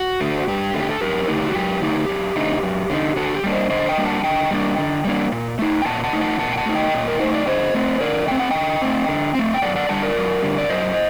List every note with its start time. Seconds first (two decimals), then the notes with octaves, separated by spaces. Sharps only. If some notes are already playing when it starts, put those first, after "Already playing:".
Already playing: F#4
0.21 D3 A3
0.48 G2 G4
0.74 D3 A3
0.80 G4
0.90 A4
1.01 F#2 G4 A#4
1.28 D3 A3 D#4 G4
1.44 F#4
1.55 F#2 G4
1.82 D3 A3 D#4 G4
2.09 F#2
2.36 D3 A3 D#4
2.63 F#2
2.90 D3 A3 D#4
3.16 D3 F#4 A4
3.35 G4
3.44 G3 A#3 D4
3.53 C5 D#5
3.70 D3 C5 D#5
3.89 D#5 G5
3.97 G3 A#3 D4
4.06 F#5 A5
4.24 D3 D#5 G5
4.51 G3 A#3 D4
4.78 D3
5.05 G3 A#3 D4
5.32 A#2
5.59 A3 D#4
5.82 G5
5.86 A#2 F#5 A5
6.04 F#5 A5
6.13 A3 D#4
6.21 F#5 A5
6.39 A#2 F#5 A5
6.53 G5
6.57 F#5 A5
6.66 A3 D#4
6.75 D#5 G5
6.94 A#2
7.08 A#4
7.20 A3 D#4 C5
7.34 D5
7.47 D3 C5 D#5
7.74 A3 C4
8.01 D3 A#4 D5
8.28 A3 C4 G5
8.39 F#5
8.50 D3 D#5 G5
8.82 A3 C4
9.09 D3
9.35 A3 C4
9.54 G5
9.62 F#2 D5 F#5
9.76 D5 F#5
9.89 D3 G3 F#5 A5
10.03 A#4 D5
10.16 F#2
10.42 D3 G3
10.58 D5
10.69 F#2 C5 D#5